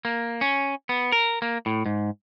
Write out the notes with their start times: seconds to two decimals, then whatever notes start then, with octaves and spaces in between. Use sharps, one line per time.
0.05 A#3
0.41 C#4
0.89 B3
1.12 A#4
1.42 A#3
1.66 A2
1.86 G#2